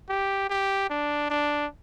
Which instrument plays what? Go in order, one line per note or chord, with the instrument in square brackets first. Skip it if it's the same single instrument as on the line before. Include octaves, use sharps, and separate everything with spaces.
[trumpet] G4
G4
D4
D4